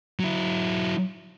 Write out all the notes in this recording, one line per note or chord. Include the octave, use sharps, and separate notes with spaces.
F#3 E4